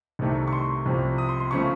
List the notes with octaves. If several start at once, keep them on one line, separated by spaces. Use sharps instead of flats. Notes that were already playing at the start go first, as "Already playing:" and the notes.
C2 C3 D#3 A3
C#6
C6
C2 C3 F3
D#6
C6
C6
C#3 F3 A3 C#6